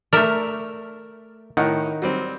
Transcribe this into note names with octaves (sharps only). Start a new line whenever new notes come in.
A3 A#4 D5 E5
A2 D#3 D#4 F#5
F#3 G3 C4